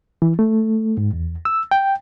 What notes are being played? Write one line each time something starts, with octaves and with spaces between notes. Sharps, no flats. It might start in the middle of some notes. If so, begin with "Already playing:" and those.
E3
A3
G#2
E2
E6
G5